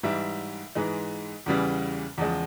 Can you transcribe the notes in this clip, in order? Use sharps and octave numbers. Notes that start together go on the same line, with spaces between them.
G#2 E3 G3 E5
G#2 E3 G#3
E2 C#3 E3 G3
E2 C#3 F3 G#3